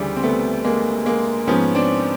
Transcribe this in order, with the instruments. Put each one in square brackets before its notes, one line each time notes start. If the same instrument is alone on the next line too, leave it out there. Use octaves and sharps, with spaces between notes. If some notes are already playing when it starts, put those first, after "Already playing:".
Already playing: [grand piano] D2 C#3 E3 G3
C4
A3 B3
G#3 A#3
G#3 A#3
G#2 F3 B3 C#4
C4 D4